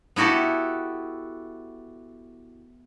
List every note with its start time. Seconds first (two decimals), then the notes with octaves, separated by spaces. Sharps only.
0.16 B3 E4 F#4 G4 A4